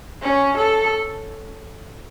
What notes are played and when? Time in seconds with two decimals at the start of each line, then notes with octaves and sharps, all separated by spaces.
0.21 C#4
0.57 A4